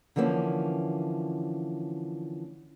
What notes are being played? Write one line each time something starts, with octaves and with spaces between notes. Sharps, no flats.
D3 E3 F3 A#3 C4 C#4